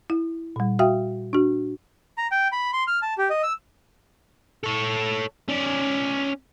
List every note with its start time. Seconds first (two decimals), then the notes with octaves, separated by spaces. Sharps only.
0.10 E4
0.56 A#2 G3
0.79 F#4 E5 F5 G5 D#6
1.33 D4 F#4
2.18 A#5
2.32 G5
2.52 B5
2.73 C6
2.87 F6
3.02 A5
3.18 G4
3.30 D#5
3.43 E6
4.63 A4 C#5
5.49 C#4 D5